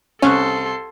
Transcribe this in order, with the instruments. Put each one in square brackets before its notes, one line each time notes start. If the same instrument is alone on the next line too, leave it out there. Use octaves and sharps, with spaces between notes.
[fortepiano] C2 C#6 F#6 [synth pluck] C#4 [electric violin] A4 C6